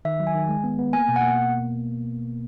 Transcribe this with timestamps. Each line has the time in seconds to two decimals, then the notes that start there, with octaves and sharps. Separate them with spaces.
0.05 D#3 E5
0.20 F#3
0.27 G#5
0.35 D#3
0.49 G#3
0.64 B3
0.79 B3
0.93 A#3 G#5
1.09 B2
1.16 F#5
1.23 A#3